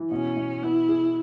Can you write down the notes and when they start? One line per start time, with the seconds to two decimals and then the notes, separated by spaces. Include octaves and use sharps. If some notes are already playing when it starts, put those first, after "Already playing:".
Already playing: E3
0.11 B2 C#4
0.37 B2
0.62 B3 E4
0.88 G#4